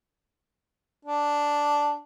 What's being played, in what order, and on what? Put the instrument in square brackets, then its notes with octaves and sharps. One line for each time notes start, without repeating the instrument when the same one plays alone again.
[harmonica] D4